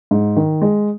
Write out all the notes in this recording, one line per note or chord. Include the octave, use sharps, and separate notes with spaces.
G#2
D#3
G#3